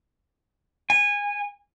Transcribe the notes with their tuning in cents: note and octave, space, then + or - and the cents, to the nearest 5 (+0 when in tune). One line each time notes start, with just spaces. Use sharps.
G#5 -20